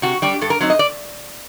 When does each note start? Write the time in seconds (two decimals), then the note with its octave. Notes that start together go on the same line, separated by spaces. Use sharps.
0.02 C3 F#4
0.22 G3 D4 G4
0.41 G2 A4
0.50 A#4
0.61 F#3 C4 D#4
0.70 D#5
0.79 D5